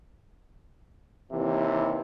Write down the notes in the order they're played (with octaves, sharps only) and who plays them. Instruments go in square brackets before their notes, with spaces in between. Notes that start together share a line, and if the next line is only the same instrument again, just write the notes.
[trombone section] D#2 C3 E3